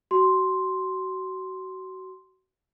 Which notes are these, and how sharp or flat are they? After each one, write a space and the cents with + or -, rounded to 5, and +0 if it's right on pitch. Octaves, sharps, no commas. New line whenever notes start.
F#4 +25 C6 +0